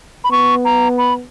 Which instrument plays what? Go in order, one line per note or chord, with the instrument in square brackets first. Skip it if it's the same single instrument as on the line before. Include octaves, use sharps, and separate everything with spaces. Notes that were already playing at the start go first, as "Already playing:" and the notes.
[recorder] B5
[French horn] B3 [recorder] C#6
[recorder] A#5
B5